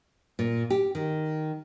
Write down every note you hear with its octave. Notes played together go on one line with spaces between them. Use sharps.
A#2
G4
D#3